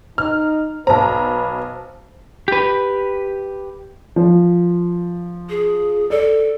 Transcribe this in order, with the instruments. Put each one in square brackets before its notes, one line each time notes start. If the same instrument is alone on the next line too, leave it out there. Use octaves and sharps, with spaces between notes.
[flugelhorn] D#4 [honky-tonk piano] F6
[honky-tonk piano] B1 A#5 [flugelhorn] B4 [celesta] C5 A5
[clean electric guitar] G4 B4
[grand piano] F3
[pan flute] G#4
[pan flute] A4 [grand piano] D5